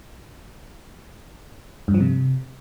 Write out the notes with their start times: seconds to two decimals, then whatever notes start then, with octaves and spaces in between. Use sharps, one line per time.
1.88 G2
1.94 F3
2.00 C3